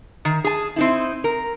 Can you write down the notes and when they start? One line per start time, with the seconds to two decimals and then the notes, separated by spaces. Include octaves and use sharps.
0.25 D#3
0.44 G#4 A5
0.76 C4 D#4 E4
1.24 A#4